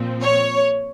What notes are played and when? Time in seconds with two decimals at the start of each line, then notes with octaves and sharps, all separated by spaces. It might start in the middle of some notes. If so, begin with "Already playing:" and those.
Already playing: A#2 F3 C4
0.22 C#5